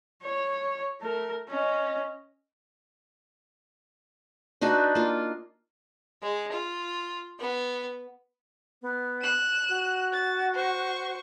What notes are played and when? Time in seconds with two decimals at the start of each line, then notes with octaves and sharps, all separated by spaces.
0.24 C#5
1.01 A3 A#4
1.49 C#4 D#5
4.61 D4 D#4 F#4 B4
4.95 A#3 F4
6.23 G#3
6.52 F4
7.40 B3
8.82 B3
9.22 F#6 E7
9.69 F#4
10.13 A6
10.54 C5 C#6